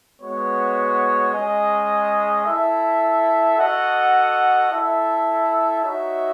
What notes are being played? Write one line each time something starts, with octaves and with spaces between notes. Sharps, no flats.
G#3 B3 F#4 C#5
G#3 C#4 G#4 D#5
E4 A4 E5
F#4 A4 D#5 F#5
E4 A4 E5
D#4 F#4 C#5 E5